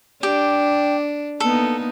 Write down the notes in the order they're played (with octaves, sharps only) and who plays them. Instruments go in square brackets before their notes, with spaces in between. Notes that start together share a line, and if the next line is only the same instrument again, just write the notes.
[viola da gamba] D4 [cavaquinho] G4
[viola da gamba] A#3 B3 D#4 [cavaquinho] A4